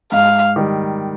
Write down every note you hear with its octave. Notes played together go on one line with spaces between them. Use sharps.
G#2 F5
D#3 G3